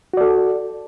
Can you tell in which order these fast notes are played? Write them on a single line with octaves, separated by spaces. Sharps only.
F#4 D5 A4